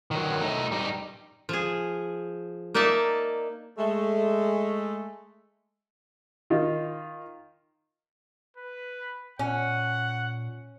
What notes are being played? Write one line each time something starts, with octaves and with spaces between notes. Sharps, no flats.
D#3 F#3
A3 D#4
G3 D#4
F3 G#4
A#3 D#4 D5 E5 A5
G#3 A3
D#3 D#4 F4
B4
A#2 C#4 F#5